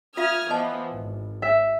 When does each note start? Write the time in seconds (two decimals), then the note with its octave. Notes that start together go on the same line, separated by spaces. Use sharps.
0.17 F4 E5 F5 D#6 F6 G#6
0.50 E3 F3 B3 D#5 A5
0.95 G#1
1.42 E5